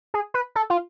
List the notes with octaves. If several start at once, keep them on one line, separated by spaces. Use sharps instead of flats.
G#4
B4
A4
F4